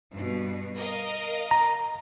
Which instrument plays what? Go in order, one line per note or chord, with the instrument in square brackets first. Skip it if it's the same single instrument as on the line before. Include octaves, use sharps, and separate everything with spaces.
[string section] G2 B2
A#4 D#5 F5
[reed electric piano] A#5